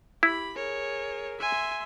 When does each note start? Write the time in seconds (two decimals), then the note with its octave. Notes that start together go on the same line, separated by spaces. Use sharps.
0.23 E4 G4 B5
0.56 G#4 A#4 C#5
1.40 E5 G#5 C6